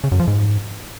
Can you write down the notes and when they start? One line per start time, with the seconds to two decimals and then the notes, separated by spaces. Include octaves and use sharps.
0.04 C#3
0.12 F#2
0.20 F3
0.27 G#2